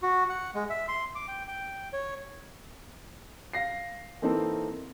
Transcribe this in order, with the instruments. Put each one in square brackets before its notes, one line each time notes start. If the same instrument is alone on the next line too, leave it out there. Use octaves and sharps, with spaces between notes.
[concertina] F#4
F#5
G#3
E5
C6
D6
G5
G5
C#5
[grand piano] F5 A#6 C7
E3 A#3 C4 D#4 A4